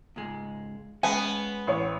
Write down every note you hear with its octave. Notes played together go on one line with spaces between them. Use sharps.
C#2 G#2 G#3
G#3 B3 C#4 G#5
A1 C#5